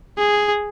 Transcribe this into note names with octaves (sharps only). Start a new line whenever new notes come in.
G#4